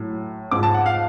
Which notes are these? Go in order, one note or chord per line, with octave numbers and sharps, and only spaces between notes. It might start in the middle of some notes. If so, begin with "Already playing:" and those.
Already playing: A2 F#3
G#2 F3 D6
A5
F#5
F5